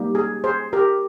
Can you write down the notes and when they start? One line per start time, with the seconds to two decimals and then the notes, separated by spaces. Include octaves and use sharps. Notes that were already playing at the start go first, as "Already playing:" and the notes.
Already playing: G3 A#3 D#4 G4
0.15 G#4
0.44 G#4 C5
0.73 G4 A#4